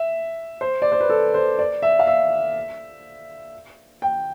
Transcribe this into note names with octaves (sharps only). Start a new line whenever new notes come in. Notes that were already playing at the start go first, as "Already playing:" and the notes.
Already playing: E5
C5
D5
C5
B4
A4
C5
D5
E5
F5
E5
G5